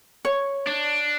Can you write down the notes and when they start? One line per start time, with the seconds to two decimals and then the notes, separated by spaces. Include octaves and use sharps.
0.25 C#5
0.67 D4